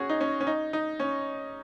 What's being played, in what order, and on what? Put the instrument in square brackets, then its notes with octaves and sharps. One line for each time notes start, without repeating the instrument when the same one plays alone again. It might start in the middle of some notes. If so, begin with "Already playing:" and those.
Already playing: [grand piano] C#4 F#4 G#4
D#4
C#4
C#4
D#4
D#4
C#4